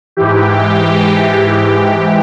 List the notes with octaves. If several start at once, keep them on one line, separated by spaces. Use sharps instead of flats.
G#2 E3 G4